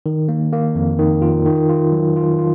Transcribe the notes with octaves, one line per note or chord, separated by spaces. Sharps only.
D#3
A#3
A#3
F2
D#3
F4
D#3
F4
F#3
F4
F4